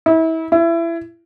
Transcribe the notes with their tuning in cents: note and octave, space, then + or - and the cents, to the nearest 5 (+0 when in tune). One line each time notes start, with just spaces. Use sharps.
E4 -30
E4 +25